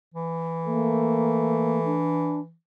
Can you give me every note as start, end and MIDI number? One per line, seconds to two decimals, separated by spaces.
0.14 2.53 52
0.66 1.98 57
0.66 1.80 58
1.85 2.40 62